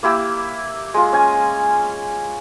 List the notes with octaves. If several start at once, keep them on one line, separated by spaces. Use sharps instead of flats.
A#3 E4 G4 E6
G#3 F4
C#4 G#5